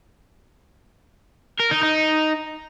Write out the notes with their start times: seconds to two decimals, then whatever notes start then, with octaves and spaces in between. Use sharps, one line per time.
1.60 A#4
1.71 D#4
1.83 D#4